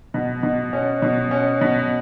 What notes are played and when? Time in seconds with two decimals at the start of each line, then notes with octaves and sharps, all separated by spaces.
0.14 B2
0.43 B2
0.73 C#4
1.02 B2
1.31 C#4
1.61 B2